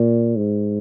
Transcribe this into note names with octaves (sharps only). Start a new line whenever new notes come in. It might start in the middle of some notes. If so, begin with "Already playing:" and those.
Already playing: A#2
G#2